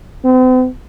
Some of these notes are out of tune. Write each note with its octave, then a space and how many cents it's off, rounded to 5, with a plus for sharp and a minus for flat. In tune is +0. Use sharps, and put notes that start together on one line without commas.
C4 -45